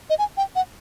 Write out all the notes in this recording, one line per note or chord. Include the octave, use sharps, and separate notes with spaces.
D#5
G#5
G5
F#5